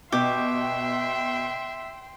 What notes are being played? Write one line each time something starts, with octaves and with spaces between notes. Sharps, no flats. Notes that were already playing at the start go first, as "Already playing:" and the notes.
B2 G4 E5 G5 C6